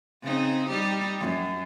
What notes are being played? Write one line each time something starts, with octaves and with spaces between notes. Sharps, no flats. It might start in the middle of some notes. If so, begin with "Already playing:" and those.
C#3 C4 D#4
G3 D#4 G4
F#2